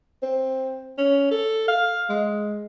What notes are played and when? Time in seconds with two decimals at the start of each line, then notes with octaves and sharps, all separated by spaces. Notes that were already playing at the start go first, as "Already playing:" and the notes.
0.23 C4
0.98 C#4
1.31 A4
1.68 F5
2.09 G#3